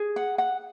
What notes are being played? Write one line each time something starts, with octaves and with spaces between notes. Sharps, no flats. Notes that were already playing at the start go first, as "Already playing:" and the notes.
Already playing: G#4
F#5
F#5